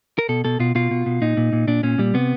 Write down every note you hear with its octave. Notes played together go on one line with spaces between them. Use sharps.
A#4
B2 A4
B2 A4
B2 F4
B2 F4
B2
B2
A#2 D#4
A#2
A#2
A#2 D4
A#2 C#4
A#2 G3
C3 B3